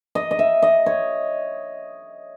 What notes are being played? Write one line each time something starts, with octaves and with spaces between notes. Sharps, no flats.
D#5
D#5
E5
D#5
C#5